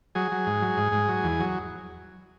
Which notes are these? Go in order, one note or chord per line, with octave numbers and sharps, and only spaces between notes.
F#3 G#4
F#3
G#2
F#3
G#2
G#2
F#3
E2
F#3